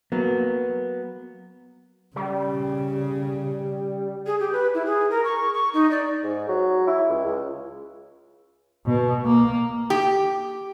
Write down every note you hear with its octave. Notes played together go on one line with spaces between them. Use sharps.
F#3 A#3 B3
C#3 G3
G#4
G4
B4
E4
G#4
A#4
C#6
C#6
D#4
D5
G#2
F#3
E4
C#2
C#2
B2
A#3
G4